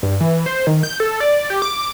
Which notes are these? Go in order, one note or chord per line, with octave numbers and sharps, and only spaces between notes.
G2
E3
C5
D#3
G6
A4
D5
G4
D6